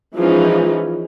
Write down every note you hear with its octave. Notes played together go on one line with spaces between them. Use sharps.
E3 F3 G#3 C#4 D#4